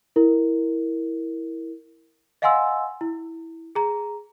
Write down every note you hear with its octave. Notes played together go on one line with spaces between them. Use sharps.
E4 A#4
D#5 F5 F#5 G#5 C6 E6
E4
G#4 A#5